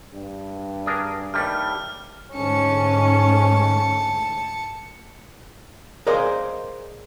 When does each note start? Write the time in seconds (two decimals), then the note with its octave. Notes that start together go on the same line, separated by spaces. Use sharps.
0.14 G2
0.86 D4 G#4 A#4
1.34 D#2 G3 A3 F6
2.35 G#2 D3 A3 C#4 A5 C#7
6.07 G#4 A#4 C5 D5 D#5 F5